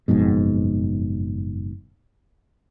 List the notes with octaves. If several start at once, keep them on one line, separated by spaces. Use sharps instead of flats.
F#1 F2 G#2 B2